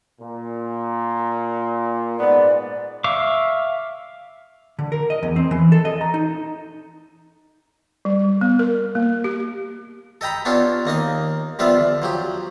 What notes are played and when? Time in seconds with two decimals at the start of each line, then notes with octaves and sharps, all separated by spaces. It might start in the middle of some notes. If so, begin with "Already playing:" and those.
0.19 A#2
2.19 G#2 B3 D5
3.04 E5 F5 C#6 D6
4.79 D3
4.92 A#4
5.10 D#5
5.23 E2
5.36 C4
5.51 E3
5.72 A4
5.85 D#5
6.01 A#5
6.14 D#4
8.05 G3
8.41 B3
8.59 A#4
8.95 A#3
9.24 G4
10.21 A4 D#5 G5 A#5 B5
10.45 B3 C#4 D4 F4 G4 A4
10.85 D#2 A#3 D#4 D#5
11.59 F3 G3 B3 F4 D5 E5
11.77 D3
12.02 F3 F#3 G4